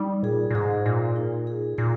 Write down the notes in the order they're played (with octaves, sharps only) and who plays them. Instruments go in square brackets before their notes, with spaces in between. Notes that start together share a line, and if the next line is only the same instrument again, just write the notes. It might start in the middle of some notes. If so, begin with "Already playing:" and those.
Already playing: [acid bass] G3 [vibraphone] D#4
[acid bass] A#2 [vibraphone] G#4
[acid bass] A#2
[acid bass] G#2 [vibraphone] G#4
[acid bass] A#2 [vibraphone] G#4
[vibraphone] D#4
G#4
[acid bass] A#2 [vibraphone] G#4